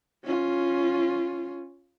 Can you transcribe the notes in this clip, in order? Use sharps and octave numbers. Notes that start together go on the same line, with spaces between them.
C#4 F4